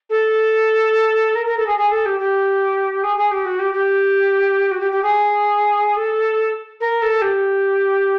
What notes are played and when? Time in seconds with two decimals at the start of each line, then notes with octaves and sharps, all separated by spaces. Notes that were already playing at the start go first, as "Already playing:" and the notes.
0.09 A4
1.35 A#4
1.46 A#4
1.57 A4
1.66 G#4
1.77 G#4
1.91 A4
2.05 G4
2.19 G4
3.03 G#4
3.16 G#4
3.31 G4
3.45 F#4
3.59 G4
3.72 G4
4.71 F#4
4.80 G4
4.91 G4
5.02 G#4
5.96 A4
6.80 A#4
7.01 A4
7.21 G4